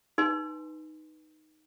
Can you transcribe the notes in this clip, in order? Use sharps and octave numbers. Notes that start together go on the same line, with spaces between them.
D#4 B4 G#5 C6